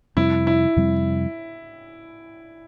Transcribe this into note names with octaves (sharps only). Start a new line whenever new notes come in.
F2 C3 G3 C4 E4
E4
F2 C3 G3 C4